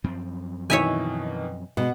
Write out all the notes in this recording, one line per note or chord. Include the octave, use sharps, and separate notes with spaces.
F#2 F3 C4
B2 D#3 E3 C#5 E5 G#5
G2 B2 G#3 F#5